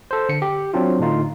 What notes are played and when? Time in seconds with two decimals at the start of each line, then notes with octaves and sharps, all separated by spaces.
0.11 A4 C5
0.29 D3 C#7
0.42 G4
0.74 F#3 C4 D4 F4
0.99 A2 D3 D#4 F4